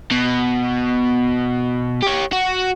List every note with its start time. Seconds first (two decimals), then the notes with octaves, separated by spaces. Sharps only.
0.12 B2
2.03 G4 C#5
2.33 F#4